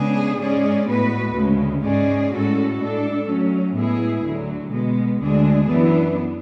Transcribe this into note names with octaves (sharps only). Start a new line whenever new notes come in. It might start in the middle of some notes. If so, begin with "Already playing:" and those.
Already playing: C#3 G#3 B3 D4 G#4
G#2 G#3 C#4 G#4 D5
A2 G#3 B3 F#4 B4
D2 C#3 G#3
G#2 G#3 C#4 G#4 D5
A2 G#3 C#4 F#4 A4
A2 G#3 D4 A4
F#3 A3 C#4
A2 G#3 B3 E4 G#4
D2 D3 F#3
B2 G#3 B3
D2 D3 G#3 D4 G#4
F#2 E3 B3 D4